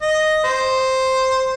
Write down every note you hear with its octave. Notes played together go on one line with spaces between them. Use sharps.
D#5
C5